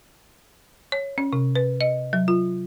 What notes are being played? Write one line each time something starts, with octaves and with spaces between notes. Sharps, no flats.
C#5
C#4
C3
B4
D#5
F#3
F4